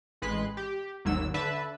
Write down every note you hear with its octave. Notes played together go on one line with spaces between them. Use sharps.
A1 G#3 B4 C6 F#6
G4
G#1 D#2 F#3 E6
D3 B4 E5 A5